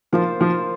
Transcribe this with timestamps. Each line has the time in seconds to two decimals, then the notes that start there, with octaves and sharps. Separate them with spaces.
0.12 F3 A#3 F4 C5
0.41 F3